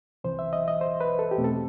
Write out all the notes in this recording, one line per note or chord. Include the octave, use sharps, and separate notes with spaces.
C2 C3 E3 C5
E5
D#5
D#5
C5
B4
A4
G4
E2 B2 A3 C4
A4